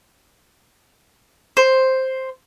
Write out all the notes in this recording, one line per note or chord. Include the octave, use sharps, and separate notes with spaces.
C5